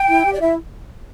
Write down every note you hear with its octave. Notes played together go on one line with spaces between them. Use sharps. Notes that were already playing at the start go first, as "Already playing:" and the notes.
Already playing: G5
E4
G4
D5
E4 E5